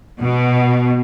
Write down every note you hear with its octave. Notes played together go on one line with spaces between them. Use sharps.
B2